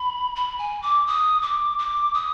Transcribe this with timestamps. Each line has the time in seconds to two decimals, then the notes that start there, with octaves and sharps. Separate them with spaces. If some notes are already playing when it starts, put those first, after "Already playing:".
Already playing: B5
0.36 B5
0.59 G#5
0.82 D6
1.07 D#6
1.42 D6
1.79 D6
2.14 D#6